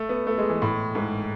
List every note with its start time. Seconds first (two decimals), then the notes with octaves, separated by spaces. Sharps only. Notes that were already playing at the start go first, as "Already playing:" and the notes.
Already playing: A3
0.09 B3
0.27 A3
0.38 G#3
0.49 E3
0.62 A2
0.95 G#2